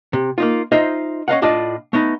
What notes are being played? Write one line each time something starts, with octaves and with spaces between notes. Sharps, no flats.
C3
A#3 D#4 F4
D#4 F4 C5 D#5 E5
C#4 D#5 F5 F#5
A2 D4 F4 D5 D#5 A5
A3 B3 D#4